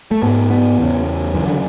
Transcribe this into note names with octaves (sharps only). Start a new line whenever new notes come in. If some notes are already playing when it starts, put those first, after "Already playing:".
A3
G#2 B3
B3
E2 C#3
F#2 C#3 E3
D3